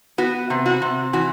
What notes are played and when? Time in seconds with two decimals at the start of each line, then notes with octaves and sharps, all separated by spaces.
0.18 B3 F#4
0.50 C3
0.66 F#4
0.82 C3
1.13 E3 F#4